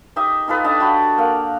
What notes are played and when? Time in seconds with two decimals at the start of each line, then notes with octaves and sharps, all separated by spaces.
0.16 D#4 G4 D#5 E5
0.48 D#4 F4 A4 B4
0.64 D4 D#5 F5 A5
0.80 F#4 G5 B5 C6
1.18 A#3 F5 F#5